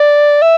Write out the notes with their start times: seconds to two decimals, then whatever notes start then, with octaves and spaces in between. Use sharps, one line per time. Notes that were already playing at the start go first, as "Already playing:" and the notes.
Already playing: D5
0.42 E5